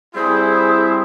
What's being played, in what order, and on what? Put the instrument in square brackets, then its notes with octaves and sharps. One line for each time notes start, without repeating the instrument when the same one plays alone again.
[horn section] G3 C4 E4 [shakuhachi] G#4